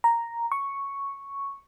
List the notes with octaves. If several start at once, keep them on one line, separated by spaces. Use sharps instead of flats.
A#5
C#6